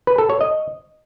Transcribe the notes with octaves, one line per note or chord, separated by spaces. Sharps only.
B4
A4
C#5
D#5